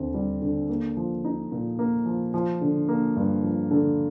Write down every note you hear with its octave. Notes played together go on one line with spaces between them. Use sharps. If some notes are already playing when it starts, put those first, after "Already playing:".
Already playing: D#2 D3 C4
G3
D3
A#3
F3
D#4
A#2
A#3
F3
F3
D3
A#3
G2
F3
D3